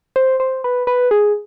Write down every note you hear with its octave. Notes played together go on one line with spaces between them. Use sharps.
C5
C5
B4
B4
G#4